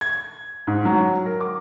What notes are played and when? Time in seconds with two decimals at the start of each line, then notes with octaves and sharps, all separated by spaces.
0.01 G#6
0.67 G#2
0.85 F#3
1.26 A#4
1.40 D6